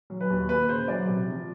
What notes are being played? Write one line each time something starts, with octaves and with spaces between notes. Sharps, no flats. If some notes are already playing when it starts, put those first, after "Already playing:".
F#3
B4
D#2
A#3 B4
C#3 C5
F#3 D5
C3
F3